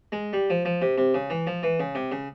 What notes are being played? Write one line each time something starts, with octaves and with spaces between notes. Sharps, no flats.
G#3
G3
F3
F3
C3
C3
C#3
E3
F3
E3
C#3
C3
C#3